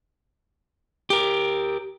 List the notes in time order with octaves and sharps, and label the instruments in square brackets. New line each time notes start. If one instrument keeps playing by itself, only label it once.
[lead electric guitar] G4 A#4